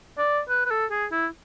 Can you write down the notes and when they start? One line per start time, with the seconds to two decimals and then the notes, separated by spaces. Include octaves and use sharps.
0.18 D5
0.49 B4
0.66 B4
0.71 A4
0.91 G#4
1.12 E4